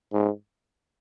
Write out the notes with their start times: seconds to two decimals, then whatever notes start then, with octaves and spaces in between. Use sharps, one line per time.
0.13 G#2